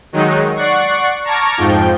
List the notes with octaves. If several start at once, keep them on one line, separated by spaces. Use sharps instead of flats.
D#3 F#3 G#3 D#4
D5 F#5 C#6 C7
A5 A#5 C#6 D6 F6 G#6
F2 G#2 F3 G5